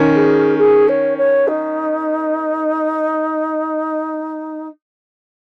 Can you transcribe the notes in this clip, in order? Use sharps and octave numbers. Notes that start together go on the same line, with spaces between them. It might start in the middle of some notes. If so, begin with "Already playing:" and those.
Already playing: D#3 C#4 A#4
G#4
G#4
C#5
C#5
D#4